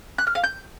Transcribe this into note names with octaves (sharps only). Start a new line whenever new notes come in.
F#6
F6
F5
G6